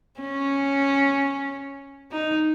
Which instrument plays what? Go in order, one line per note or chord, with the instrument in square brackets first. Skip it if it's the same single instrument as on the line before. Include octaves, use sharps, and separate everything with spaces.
[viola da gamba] C#4
D#4